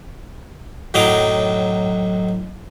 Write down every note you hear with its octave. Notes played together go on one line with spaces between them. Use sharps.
F#2 A2 D#3 F#3 A#5 D6